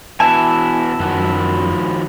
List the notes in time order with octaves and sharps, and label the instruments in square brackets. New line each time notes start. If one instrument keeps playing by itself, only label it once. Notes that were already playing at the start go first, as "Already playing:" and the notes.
[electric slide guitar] B2 E3 [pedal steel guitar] E4 E5 G#5 [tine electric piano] A5
[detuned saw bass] F#2 [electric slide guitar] D#3 F3 F#4